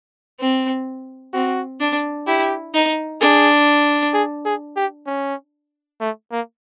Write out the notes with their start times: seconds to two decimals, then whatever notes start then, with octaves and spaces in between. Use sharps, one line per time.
0.40 C4
1.33 C4 F#4
1.81 D4
2.27 E4 G4
2.74 D#4
3.20 D4 G#4
4.14 G#4
4.45 G#4
4.76 G4
5.07 C#4
6.01 A3
6.32 A#3